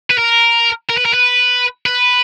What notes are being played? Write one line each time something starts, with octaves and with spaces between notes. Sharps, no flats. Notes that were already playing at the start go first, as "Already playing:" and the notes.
B4
A#4
A#4
B4
A#4
B4
B4